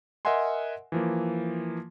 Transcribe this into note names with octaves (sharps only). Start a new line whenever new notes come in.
A#4 D#5 E5 F#5 G#5 C6
E3 F3 A#3